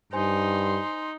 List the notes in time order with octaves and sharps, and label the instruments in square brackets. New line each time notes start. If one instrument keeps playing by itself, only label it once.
[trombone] G2 [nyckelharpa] D#4 [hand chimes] C5 G#5 [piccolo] C6